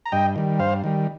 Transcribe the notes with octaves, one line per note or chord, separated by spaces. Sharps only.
A#5
G2 D#5 G5
D#3 G3
G2 C5 F5
D#3 G3